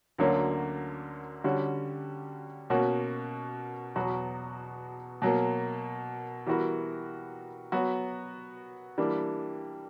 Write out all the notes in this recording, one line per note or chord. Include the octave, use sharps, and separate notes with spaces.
D2 D3 F#3 A#3 C#4
D3 G3 C#4 F#4
B2 A#3 C#4 F#4
E2 B2 F#3 B3 F#4
B2 F#3 A#3
E3 G3 B3 F#4 A#4
F#3 B3 F#4
E3 G3 A#3 D4